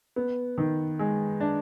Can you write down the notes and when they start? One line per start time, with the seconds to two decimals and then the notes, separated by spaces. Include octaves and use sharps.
0.16 B3
0.58 D#3
0.99 G#3
1.41 D4